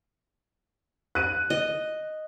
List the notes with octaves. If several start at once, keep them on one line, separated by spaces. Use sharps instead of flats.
F#6 D#7
D#5